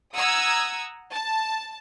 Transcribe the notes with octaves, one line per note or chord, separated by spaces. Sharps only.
F#5 A#5 D#6 E6 G#6
A5